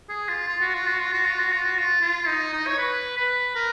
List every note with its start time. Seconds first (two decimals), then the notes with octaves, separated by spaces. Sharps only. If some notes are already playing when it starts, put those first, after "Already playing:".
0.09 G#4
0.29 F4
0.48 F4
0.61 F#4
0.74 F4
0.87 F#4
1.00 F4
1.13 F#4
1.26 F4
1.39 F#4
1.52 F4
1.65 F#4
1.79 F4
2.01 F4
2.27 D#4
2.53 D#4
2.67 C#5
2.78 B4
3.17 B4
3.55 A#4